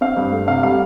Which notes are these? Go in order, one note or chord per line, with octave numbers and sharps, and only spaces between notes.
C4 F5
G2
A3
C3 F5
G3 F5